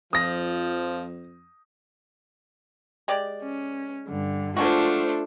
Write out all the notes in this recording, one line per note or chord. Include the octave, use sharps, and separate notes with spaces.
F2 F3 D#6 A#6
G#3 G4 D5
C#4
G2 D3
F3 G#3 A3 D4 F4 F#4 C5